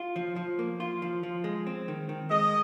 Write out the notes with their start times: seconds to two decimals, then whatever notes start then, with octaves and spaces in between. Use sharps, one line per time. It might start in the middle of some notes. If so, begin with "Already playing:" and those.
Already playing: F4
0.16 F3
0.36 F3
0.59 A#3
0.80 F4
1.02 F3
1.23 F3
1.44 G#3
1.67 C4
1.88 D#3
2.09 D#3
2.30 G#3 D#5